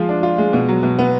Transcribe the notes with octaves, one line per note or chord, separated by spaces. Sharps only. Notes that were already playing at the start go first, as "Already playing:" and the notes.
Already playing: F3 G#3 F4
D4
F4
G#3
B2
F#3
B2
B3